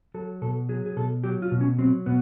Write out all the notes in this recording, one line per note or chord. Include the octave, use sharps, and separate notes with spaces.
F#3 A4
B2 A4
F#3 G#4
G#4
B2 A4
F#3 G4
F4
B2
C#4
F#3 C4
B2 B3